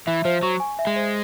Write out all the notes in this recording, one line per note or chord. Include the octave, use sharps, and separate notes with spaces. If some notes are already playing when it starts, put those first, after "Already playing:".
E3 E5
F3 C5
F#3 C#6
G#5
E5
G#3
C5